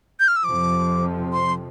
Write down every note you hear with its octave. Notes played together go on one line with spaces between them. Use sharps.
G6
F6
E6
F2 C3 F3 D6
C6